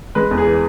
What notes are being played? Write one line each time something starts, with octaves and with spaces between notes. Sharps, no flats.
G#3 B4
E2
G#4
E3